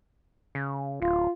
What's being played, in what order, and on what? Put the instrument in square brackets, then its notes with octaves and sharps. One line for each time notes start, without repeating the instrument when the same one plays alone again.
[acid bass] C#3
[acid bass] D1 [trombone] F4